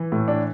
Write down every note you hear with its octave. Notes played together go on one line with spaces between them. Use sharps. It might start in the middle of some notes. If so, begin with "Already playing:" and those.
Already playing: E3
A2
D4